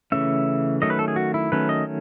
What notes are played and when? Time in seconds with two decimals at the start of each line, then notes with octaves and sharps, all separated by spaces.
0.12 C#3 E3 A3 C#4 E5
0.82 D#3 F#3 A3 C#4 D#5
0.90 B4
0.99 A4
1.08 G#4
1.16 F#4
1.34 E4
1.52 D#3 F#3 A3 C#4 B4
1.69 D#5